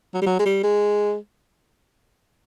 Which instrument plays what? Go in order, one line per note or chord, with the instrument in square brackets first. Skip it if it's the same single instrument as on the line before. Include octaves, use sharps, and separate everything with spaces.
[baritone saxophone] F#3
G3
F#3
G#3
G3
G#3